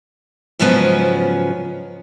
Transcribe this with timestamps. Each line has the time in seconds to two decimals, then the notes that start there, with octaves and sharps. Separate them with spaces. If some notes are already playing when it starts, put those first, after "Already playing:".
0.59 G#2 C#3 F3 F#3 B3 C#4